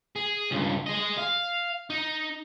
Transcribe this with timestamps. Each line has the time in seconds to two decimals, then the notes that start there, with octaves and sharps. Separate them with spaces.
0.16 G#4
0.51 C#2 G2
0.86 G#4 D#5
1.18 F5
1.90 D#4